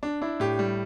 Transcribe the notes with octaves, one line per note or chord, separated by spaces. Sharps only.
D4
D4 E4
A2 G4
G3